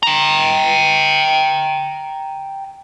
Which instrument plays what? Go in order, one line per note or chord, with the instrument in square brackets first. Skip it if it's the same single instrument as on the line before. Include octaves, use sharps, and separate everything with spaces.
[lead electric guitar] G5 A#5